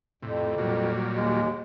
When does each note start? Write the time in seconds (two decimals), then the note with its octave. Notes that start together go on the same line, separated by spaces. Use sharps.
0.22 F2 A2 C3
0.58 A#2 F#3 G3
1.14 D#2 G#3